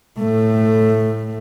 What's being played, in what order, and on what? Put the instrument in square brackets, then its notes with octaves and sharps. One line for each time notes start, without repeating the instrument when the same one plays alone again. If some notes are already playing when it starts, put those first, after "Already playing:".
[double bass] A2 A3